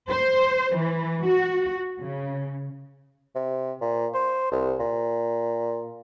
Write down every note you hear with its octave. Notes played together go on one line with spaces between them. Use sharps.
C5
E3
F#4
C#3
C3
A#2
C5
C2
A#2